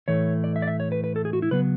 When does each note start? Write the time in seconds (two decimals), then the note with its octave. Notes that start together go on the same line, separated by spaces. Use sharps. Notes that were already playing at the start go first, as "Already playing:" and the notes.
0.08 A2 E3 A3 C#5
0.44 D5
0.56 E5
0.62 D5
0.67 E5
0.80 C#5
0.92 B4
1.04 B4
1.16 A4
1.25 G#4
1.33 F#4
1.42 E4
1.51 C#3 F#3 B3 B4